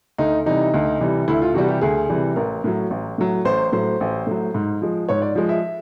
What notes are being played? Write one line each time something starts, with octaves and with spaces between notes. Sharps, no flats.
D2 D#4
C3 E3 G3 D#4
D2
C3 E3 G3
D2 E4
F4
C3 E3 G3 F#4
G4
D2 G#4
C3 E3 G3
A1 A#4
A2 F#3
A1
A2 F#3
A1 C5
A2 F#3 C5
A1
A2 F#3
G#2
F3 G#3
G#2 C#5
D5
F3 G#3
E5